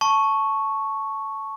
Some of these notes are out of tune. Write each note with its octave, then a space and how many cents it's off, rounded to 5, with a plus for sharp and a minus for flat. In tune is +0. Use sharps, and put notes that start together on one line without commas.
A5 +0 C#6 +0